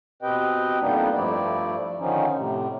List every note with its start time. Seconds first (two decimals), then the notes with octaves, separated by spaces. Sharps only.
0.22 B2 C4 G4 B4 D#5 G5
0.80 F2 G3 A#3 B3 D4 D#4
1.13 G2 F3 A3 E4 D5
1.99 D3 D#3 F3 C#4 D#4
2.36 A2 C3